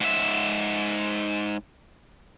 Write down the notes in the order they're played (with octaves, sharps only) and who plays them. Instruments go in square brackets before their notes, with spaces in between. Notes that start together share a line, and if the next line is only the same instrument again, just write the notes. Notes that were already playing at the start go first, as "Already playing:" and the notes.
[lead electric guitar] G#2 E5